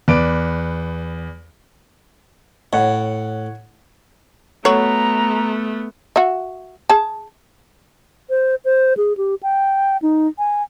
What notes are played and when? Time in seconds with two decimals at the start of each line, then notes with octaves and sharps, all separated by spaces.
0.08 E2 B4 D5 D7
2.73 A2 C#5 F#5
4.65 F#3 A3 B3 A4 C#5 A#5
6.16 F#4 E5
6.90 G#4 A5
8.30 C5
8.65 C5
8.97 G#4
9.17 G4
9.43 G5
10.02 D#4
10.39 G#5